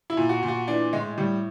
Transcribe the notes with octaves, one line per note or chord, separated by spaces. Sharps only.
E4
A#2
F#4
A#2
F#4
E3 D4
A2 G#3
A2 G3